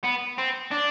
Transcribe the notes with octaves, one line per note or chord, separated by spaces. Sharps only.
B3
C4
D4